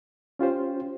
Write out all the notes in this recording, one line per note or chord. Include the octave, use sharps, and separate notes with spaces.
C#4 F4 G4 C5